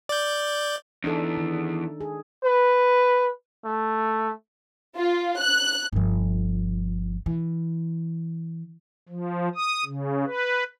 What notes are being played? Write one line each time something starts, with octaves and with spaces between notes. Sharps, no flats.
D5 G6
E2 D4 D#4 A4
D#3
G#4
B4
A3
F4
F#6
G1 F3
E3
F3
D#6
C#3
B4